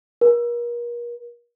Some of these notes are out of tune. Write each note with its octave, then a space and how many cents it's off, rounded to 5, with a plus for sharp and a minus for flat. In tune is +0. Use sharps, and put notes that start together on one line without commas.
A#4 +35